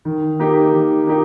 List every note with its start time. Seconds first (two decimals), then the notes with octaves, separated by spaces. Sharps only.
0.05 D#3
0.39 A#3 D#4 G4
0.73 D#3
1.07 A#3 D#4 G4